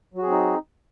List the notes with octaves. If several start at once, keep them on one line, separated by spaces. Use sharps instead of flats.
F#3 C4 D#4 F#4 G#4